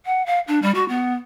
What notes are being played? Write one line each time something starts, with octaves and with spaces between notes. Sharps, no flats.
F#5
F5
D4
G3
F#4
B3